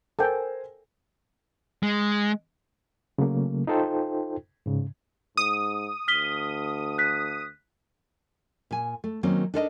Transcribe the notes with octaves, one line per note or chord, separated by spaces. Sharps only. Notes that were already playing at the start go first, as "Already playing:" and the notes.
A4 A#4 C5 G5 G#5
G#3
C#3 F#3 A3 A#3
D#4 F4 A4 C5 G5
G#2 C#3
G#2 D#6
D2 F6 B6 G7
F#6 B6
A#2 G#5
A3
D#3 F#3 A#3 C4 C#4
D4 D#4 A4 A#4 C5 D#5